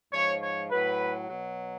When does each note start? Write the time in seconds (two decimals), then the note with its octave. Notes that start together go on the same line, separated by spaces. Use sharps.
0.12 G#2 F3 C#5
0.42 C#5
0.70 A2 F#3 B4
1.29 B2 F#3